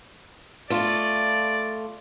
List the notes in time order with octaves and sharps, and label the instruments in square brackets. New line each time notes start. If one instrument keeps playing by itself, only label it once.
[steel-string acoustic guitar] A3 F4 [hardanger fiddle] D5